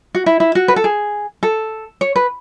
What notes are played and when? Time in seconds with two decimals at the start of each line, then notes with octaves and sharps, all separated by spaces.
0.15 F#4
0.26 E4
0.40 E4
0.55 F#4
0.68 B4
0.76 A4
0.84 G#4
1.43 A4
2.01 C#5
2.16 B4